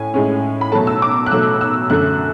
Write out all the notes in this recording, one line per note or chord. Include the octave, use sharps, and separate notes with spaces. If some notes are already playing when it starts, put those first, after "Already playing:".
Already playing: A2 C#4 G#5
A2 G#3 C#4
B5
B2 F#3 A3 A5
E6
D6
F#6
B2 F#3 A3 E6
E6
F#2 D3 A3 F#6